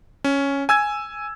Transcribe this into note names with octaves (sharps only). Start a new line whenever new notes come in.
C#4
G#5 E6 G#6